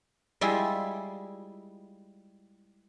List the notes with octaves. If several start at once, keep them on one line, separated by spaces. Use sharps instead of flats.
G3 G#3 E4 F4